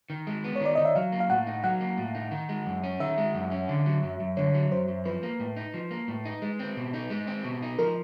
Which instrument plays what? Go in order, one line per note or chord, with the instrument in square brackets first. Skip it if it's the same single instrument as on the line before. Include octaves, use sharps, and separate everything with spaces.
[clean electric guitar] D#3
G#3
B3
[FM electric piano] C#5
[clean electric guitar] D#3 [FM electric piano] D5
[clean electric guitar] D#3 [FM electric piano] D#5
[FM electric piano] E5
[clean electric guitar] F#3 [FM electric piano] F5
[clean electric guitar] A#3
[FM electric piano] F5
[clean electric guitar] A2 [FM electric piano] F#5
[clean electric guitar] D#4
[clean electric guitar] F#3 [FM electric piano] F#5
[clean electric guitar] A#3
A2
D#4
D#3
G#3
F#2
C#4
[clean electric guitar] D#3 [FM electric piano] E5
[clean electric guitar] G#3
F#2
C#4
D3
F#3
F#2
F#2
[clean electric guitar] D3 [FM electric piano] C#5
[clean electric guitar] F#3
[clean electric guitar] F#2 [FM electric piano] C5
[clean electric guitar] F#2
[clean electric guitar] F3 [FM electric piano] B4
[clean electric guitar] A#3
A2
D#4
F3
A#3
A2
D#4
G#3
C4
B2
D#4
G#3
C4
B2
D#4
[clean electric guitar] F3 [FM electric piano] A#4